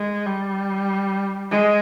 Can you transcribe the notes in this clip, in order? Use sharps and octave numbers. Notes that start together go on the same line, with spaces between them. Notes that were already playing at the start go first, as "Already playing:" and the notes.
Already playing: G#3
G3
G#3